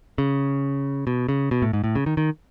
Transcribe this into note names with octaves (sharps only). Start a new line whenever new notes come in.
C#3
B2
C#3
B2
A2
G#2
A2
C#3
D#3
D#3